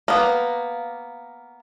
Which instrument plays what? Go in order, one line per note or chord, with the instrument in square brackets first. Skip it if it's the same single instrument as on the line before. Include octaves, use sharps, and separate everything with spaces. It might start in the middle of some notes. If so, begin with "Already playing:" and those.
[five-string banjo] A#3 B3